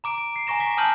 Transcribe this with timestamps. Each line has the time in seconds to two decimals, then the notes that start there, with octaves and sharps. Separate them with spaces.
0.04 A#5 D6 D7
0.18 D7
0.36 C7
0.47 G#5 A#5 C#6 A#6 E7
0.60 A#5 D6 B6
0.77 G#5 A5 D#6 F6 G6 F#7